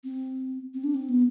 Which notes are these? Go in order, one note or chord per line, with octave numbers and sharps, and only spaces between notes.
C4
C4
D4
C4
B3